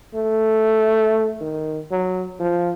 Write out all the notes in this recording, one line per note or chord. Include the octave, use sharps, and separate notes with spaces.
A3
D#3
F#3
F3